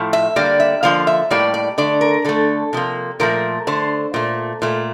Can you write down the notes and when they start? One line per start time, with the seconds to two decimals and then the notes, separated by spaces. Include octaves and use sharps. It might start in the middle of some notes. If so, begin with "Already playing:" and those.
Already playing: A2 F3 A3
0.13 E5
0.36 D3 G3 A#3 D5
0.60 E5
0.83 D3 F3 A#3 F5
1.07 E5
1.30 A2 G3 A#3 D5
1.54 D5
1.78 D3 A3 D5
2.01 A#4
2.25 D3 A3 A4
2.73 C3 F3 A#3
3.20 A#2 F3 A3 A#4
3.67 D3 A3 C5
4.14 A#2 A3
4.62 A#2 A3